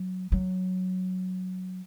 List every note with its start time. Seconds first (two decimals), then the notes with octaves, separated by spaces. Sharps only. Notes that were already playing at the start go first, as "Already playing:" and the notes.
Already playing: F#3
0.32 F#3